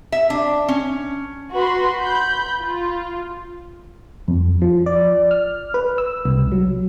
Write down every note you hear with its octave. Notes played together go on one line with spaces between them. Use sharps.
E5
D4
C#4
F#4 B4 B5 C6
B5 G6
F4
F2
F3
D5
F6
B4
E6
C2
F#3